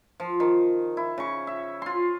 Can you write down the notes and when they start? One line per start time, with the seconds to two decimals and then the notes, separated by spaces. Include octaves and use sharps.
0.20 F3
0.40 D#3
0.97 E4
1.18 C#3 C#6
1.47 E5
1.82 F4 C6